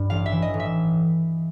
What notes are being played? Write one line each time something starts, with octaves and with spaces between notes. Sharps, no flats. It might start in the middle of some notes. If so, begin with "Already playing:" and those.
Already playing: G2
A1 F5
E5
E3
D#5
A1
E5